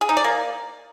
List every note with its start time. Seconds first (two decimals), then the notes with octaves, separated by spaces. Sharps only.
0.01 G#4
0.09 D#4
0.17 D5
0.24 A#3